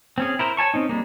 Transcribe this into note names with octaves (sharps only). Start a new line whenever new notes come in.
C4 C#4 G#4
E4 A#4 C5
C#5 G#5 A5 C#6
C4 C#4 D#4
G3 G#3 A#3